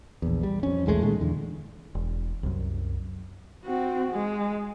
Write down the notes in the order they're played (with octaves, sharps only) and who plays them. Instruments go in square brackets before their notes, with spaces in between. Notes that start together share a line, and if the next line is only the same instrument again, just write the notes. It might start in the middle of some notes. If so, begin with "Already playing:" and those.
[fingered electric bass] A#1 E2
G3
F2 C#4
B1 E2 G#3 A3
A#2 D#3 G#3 A3
E2 D3
E1
C2 F#2
[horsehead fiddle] C4 F#4
G#3